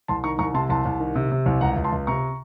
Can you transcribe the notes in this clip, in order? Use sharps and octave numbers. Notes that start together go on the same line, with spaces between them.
C2 A5 C6
D#3 A#5 C#6
C2 A#5 C#6
C3 A5 C6
C2 A5 C6
C2
D#3
C3
C3
C2
C#2 F#5 A#5
C#2
A5 C6
C#2
C3 A#5 C#6